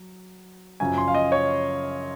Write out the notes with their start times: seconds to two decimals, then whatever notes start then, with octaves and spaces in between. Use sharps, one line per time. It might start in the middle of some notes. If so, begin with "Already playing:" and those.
Already playing: F#3
0.80 F#2 C#3 F3 G#5
0.98 C6
1.08 F5
1.15 D#5
1.32 C#5